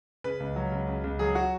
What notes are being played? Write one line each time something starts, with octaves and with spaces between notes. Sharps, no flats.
C#3 B4
C#2
F#3
C#2
C#3
C#2
F#3 G#4
F#4